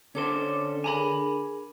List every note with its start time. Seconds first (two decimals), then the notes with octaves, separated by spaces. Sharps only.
0.15 D3 C#4 A4 C5 C#5 D6
0.84 D4 G#4 A#4 G#5 A#5 B5